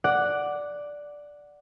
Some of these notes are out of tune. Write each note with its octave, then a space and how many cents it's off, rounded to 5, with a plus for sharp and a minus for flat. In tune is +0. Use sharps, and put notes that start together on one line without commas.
D5 +0 F#5 +0